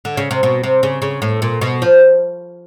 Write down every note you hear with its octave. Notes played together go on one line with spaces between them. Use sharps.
D3
C#3
C3
B2
C3
C#3
C#3
A2
A#2
B2
F3